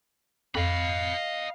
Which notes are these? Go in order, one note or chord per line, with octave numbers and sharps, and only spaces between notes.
F2 D#5 F5 B5